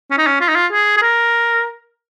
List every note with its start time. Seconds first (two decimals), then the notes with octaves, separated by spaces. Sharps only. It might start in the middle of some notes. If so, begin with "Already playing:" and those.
0.11 C#4
0.18 D#4
0.27 C#4
0.41 F4
0.49 D#4
0.55 F4
0.72 G#4
0.97 G#4
1.02 A#4